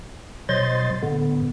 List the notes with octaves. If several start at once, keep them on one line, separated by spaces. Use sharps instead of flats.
B2 F#3 C5 D#5 C6 A6
A2 D3 B3